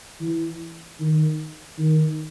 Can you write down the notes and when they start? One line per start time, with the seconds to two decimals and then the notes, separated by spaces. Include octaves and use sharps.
0.20 E3
1.00 D#3
1.78 D#3